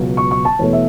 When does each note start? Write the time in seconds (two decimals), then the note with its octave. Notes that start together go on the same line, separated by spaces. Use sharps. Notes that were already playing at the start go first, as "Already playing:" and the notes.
Already playing: C#2 B2 F#3
0.17 C#6
0.31 C#6
0.45 A5
0.59 E2 B2 A3 C#5
0.73 E5